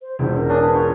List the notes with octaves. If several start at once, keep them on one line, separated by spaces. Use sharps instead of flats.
C5
E1 A1 E2 C5
A#4
C#4 D4 D#6
G#4 B4
F4 C#5 G5